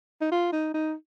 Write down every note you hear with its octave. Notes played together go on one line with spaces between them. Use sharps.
D#4
F4
D#4
D#4